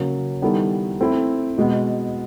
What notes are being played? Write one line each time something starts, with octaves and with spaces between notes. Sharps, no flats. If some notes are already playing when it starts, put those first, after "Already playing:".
Already playing: C#3 F#3 A#3 C#4
D#3 G3 B3 E4 A4
A3 C4 E4
B2 G#3 B3